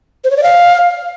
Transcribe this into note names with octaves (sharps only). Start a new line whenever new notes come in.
C5
C#5
D5
F5